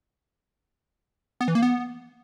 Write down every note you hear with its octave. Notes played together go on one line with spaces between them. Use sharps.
B3
E3
A#3
B3